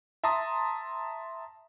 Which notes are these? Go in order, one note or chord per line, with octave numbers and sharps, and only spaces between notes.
E5 A5 A#5 C6 D#6